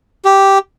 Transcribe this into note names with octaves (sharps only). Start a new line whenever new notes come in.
G4